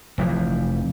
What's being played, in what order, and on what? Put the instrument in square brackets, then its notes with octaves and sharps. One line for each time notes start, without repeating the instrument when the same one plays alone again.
[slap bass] F1 E3 F3